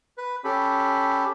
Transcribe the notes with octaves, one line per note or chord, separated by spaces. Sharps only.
B4
C#4 G4 A4 B5